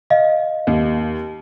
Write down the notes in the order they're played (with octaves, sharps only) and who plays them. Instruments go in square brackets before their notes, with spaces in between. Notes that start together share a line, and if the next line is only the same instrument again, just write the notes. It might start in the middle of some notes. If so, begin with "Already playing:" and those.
[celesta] D#5 F5
[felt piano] D#2